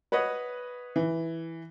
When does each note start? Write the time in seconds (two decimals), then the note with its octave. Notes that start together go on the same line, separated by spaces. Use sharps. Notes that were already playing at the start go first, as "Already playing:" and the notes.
0.12 B4 C#5 D#5 F#5
0.96 E3